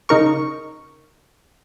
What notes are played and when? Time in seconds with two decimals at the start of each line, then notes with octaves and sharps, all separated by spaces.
0.09 C#3 D#4 A#4 C#6